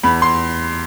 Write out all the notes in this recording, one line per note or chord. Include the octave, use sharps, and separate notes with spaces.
E2 B5
C6